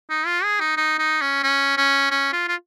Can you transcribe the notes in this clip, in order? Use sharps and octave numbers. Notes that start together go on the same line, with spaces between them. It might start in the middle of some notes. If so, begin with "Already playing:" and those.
D#4
F4
G#4
D#4
D#4
D#4
C#4
C#4
C#4
C#4
F4
F4